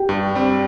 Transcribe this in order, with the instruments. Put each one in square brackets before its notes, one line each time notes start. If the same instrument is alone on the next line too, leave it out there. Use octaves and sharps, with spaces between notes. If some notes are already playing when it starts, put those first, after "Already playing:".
Already playing: [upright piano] G4 G5
[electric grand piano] G2
G3 C4